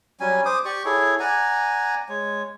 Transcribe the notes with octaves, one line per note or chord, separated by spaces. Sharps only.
F#3 G3 C#4 G#5
C5 D6 D#6
G4 D5 C#6
E4 G#4 A4 C#5
D5 F#5 G#5 A#5
G#3 C#5